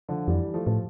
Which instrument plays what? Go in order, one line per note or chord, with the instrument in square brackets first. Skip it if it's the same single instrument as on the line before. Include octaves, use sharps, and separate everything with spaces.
[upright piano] D3 F3
[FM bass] F2 [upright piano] E3 G3
[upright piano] F3 A3
[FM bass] A2